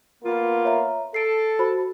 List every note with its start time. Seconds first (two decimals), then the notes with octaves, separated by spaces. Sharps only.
0.23 A#3 B3 F4
0.65 C#5 E5 A#5
1.14 A4 C7 D7
1.59 F#4 C5 B5